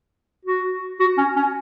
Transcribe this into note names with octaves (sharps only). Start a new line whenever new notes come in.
F#4
F#4
C#4
C#4